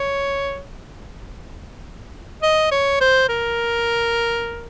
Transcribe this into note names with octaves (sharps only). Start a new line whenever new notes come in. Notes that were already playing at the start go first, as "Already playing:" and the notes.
Already playing: C#5
D#5
C#5
C5
A#4